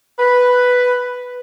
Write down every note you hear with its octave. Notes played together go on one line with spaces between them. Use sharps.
B4